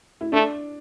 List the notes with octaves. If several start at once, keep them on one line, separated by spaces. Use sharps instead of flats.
E4
A3 D4